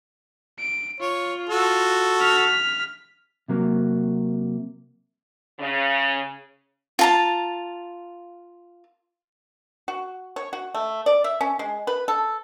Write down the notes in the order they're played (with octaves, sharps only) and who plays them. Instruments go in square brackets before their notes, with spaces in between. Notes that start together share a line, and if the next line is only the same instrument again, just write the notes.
[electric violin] D7
[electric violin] F4 [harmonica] C#5
[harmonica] F#4 A4
[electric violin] F6 B6
[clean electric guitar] C3 F#3 A#3
[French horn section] C#3
[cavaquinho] F4 A5 A#5
[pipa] F#4
C#5
F#4
A3
D5
E5
C#4
G#3
B4
A4